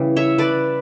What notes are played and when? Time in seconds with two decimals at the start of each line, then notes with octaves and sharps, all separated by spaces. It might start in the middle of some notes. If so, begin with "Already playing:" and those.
Already playing: C#3 E3 G3
0.16 C#5 E5
0.38 B4 D5